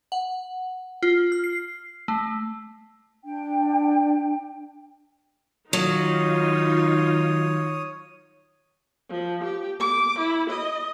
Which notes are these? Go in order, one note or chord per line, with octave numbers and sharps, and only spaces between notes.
F#5
F4
F6
C7
A3
D4 G5
D#3 F#3 D#4 F4 C#5 D#6
F3
G4
D6
E4
D#5